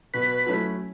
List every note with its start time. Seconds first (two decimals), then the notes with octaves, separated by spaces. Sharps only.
0.14 B2 B4
0.46 F#3 A3 C#4 E4